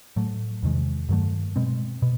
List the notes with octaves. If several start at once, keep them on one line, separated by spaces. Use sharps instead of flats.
A2 F#3 A3
E2 C3 D#3 G#3
G2 D#3 F#3 A3
B2 G#3 C4
B2